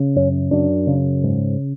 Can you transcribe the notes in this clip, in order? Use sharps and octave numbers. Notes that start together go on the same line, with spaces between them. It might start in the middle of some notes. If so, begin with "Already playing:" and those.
Already playing: C#3
F#2 C#4
F#2 D4
C#3
G#2